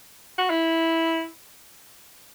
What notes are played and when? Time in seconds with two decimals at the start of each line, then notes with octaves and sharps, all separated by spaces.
0.38 F#4
0.50 E4